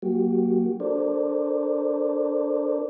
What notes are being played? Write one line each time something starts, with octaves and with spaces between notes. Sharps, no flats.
F#3 A#3 F#4 G4
D4 A4 A#4 C5 D5